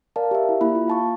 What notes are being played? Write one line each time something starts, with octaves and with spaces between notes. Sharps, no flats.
A#4 D5 F5 A5
G4 E5
E4
A#3 E4 B5
F4
F5 A5 C#6